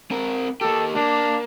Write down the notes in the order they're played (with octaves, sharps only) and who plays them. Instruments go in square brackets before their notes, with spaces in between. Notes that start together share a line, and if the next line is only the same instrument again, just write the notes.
[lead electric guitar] C4 A#4
[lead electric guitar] A#3 G4 [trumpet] A4
[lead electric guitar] A#3 [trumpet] D4